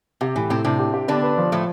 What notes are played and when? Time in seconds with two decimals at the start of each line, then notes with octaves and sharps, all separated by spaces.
0.21 C3 G4
0.35 A2 E3
0.50 A2 C3 C4
0.64 C3 C4 D4
0.79 G4
0.94 G4
1.08 D3 B3 D4
1.23 B4
1.38 F3
1.52 A2 F3 A3